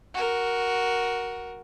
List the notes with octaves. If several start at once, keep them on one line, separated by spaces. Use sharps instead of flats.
F#4 A#4